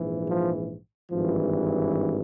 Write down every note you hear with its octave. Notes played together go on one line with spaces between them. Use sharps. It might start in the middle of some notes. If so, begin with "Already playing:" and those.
Already playing: A#1 G#2 E3
F3
G#1 G2 E3 F3